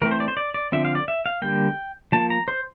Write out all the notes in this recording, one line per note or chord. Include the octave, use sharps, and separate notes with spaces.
E3 A3 C4 A#4
C5
D5
C5
D5
D5
D3 F3 C4 E5
F5
D5
E5
F5
D3 G3 A#3 G5
F3 A#3 A5
A#5
C5